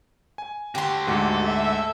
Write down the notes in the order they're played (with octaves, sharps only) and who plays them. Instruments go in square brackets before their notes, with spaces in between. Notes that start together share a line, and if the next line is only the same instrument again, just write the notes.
[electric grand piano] G#5
[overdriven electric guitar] D3 F#4 [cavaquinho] G4 C6
[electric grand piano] D2 G#2 [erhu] F#4 [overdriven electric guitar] A4
[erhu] E5